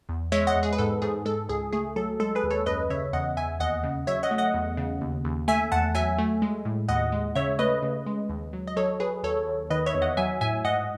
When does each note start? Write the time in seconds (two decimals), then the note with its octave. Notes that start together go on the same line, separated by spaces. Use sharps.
0.09 E2
0.32 G#3 C#5 E5
0.47 D#5 F#5
0.56 E2
0.63 G#4
0.73 B4
0.78 G#2 A4
1.02 G#2 G#4
1.25 G#3 A4
1.49 C#2 G#4
1.73 A3 G#4
1.96 F#3 A4
2.20 G#3 A4
2.35 G#4 B4
2.43 D#2
2.50 A4 C#5
2.66 F#2 B4 D#5
2.90 C#3 C#5 E5
3.13 E2 D#5 F#5
3.37 E2 E5 G#5
3.60 D#2 D#5 F#5
3.83 C#3
4.07 F#3 C#5 E5
4.23 D#5 F#5
4.31 A3
4.38 D#5 F#5
4.54 E2
4.77 C#3
5.01 D#2
5.25 D#2
5.48 A3 E5 G#5
5.72 E2 F#5 A5
5.95 F#3 E5 G#5
6.18 A3
6.42 G#3
6.65 A2
6.88 D#2 D#5 F#5
7.12 G#3
7.35 C#3 C#5 E5
7.59 A3 B4 D#5
7.82 C#3
8.06 G#3
8.29 D#2
8.53 F#3
8.67 D#5
8.76 F#3 A4 C#5
9.00 F#3 G#4 B4
9.23 D#2 A4 C#5
9.47 D#2
9.70 D#3 B4 D#5
9.86 C#5 E5
9.94 E2
10.02 D#5 F#5
10.17 F#3 E5 G#5
10.41 A2 E5 G#5
10.64 G#2 D#5 F#5